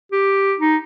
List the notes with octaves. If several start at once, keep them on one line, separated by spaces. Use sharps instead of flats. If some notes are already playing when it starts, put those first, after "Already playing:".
G4
D#4